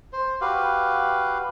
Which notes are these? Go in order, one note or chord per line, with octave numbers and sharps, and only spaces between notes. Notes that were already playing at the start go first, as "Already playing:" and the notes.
C5
F#4 G4 B4 F5